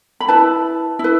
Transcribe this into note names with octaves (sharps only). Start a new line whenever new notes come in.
B5
E4 B4 A5
E4 B4